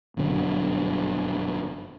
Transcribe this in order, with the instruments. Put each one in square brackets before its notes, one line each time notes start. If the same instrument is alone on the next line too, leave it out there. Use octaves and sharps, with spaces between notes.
[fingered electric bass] G1 F#2 B2 D3